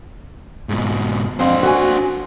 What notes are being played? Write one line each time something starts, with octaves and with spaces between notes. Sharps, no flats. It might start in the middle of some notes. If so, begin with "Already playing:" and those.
G#2 B2
F2 D4 C5
F#4 G#5